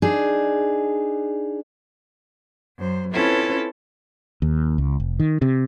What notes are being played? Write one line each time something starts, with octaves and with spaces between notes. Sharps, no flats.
D4 D#4 G#4
F#2 C5
C4 C#4 E4 F4 A4 B4
D#2
C#2
F1
D#3
C3